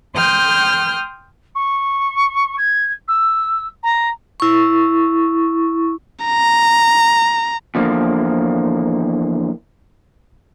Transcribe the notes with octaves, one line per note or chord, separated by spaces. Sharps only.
G5 C6 D#6 F6 G6
C#6
G#6
E6
A#5
E4 C#6
A#5
E2 D3 F3 A3 A#3